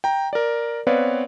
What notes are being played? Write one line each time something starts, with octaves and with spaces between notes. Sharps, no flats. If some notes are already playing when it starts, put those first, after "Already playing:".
G5 A#5
A#4 D5
B3 C4 B4 C#5 D5 F5